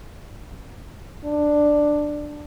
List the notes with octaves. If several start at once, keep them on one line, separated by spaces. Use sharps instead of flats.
D4